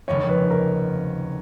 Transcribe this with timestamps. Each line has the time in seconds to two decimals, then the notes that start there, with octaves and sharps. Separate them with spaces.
0.08 F1 D#2 C#3 F3 G#3 C#5
0.29 B4
0.51 A#4